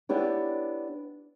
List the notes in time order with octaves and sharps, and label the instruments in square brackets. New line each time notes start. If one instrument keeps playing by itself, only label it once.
[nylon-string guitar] B3 D4 E4 G4 C#5